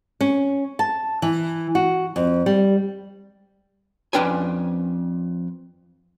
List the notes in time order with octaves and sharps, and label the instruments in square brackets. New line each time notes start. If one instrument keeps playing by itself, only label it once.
[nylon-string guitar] C#4
A5
E3
F#4
F2
G3
[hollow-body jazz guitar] F2 C#4 D4 B4 G5 G#5